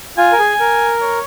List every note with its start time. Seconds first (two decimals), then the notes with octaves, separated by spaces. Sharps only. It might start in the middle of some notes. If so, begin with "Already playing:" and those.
0.18 F4 G#5
0.32 A#4
0.39 G#4
0.60 A#4
1.02 C#5